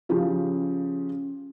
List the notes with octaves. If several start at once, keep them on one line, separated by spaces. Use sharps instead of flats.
C#3 F3 G4